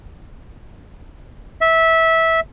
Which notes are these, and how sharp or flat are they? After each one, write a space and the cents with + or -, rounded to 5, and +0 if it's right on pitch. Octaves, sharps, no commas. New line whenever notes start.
E5 -15